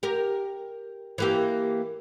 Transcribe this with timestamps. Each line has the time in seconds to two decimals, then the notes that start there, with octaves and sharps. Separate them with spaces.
0.03 G4 A#4
1.18 E3 A#3 G4